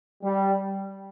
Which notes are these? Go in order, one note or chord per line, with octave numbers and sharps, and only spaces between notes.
G3